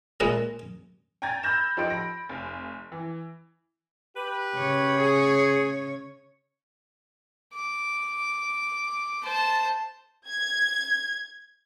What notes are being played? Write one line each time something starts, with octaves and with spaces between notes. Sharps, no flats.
A#2 G#3 B4 D#5 E5
G5 G#5 A#5 G#6 A6
B5 E6 F6 G6 A#6 E7
F3 D#4 G4 A4 C6 D7
B5 A#6
F1
E3
G4 B4
C#3 C#5
G#4
D6
C5 A5
G#6